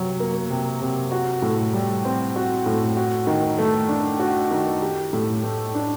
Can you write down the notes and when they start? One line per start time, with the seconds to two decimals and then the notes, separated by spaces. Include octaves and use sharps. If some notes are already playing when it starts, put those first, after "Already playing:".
Already playing: C3 F#3
0.20 A#3
0.50 C3
0.81 C3
1.12 F#4
1.42 A2
1.73 G3
2.05 C4
2.36 F#4
2.66 A2
2.97 F#4
3.27 D#3
3.58 A3
3.89 D4
4.19 F#4
4.51 D#3
4.82 G4
5.13 A2
5.43 A3
5.75 D4